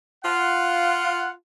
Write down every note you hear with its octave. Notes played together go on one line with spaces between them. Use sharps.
F4 F#5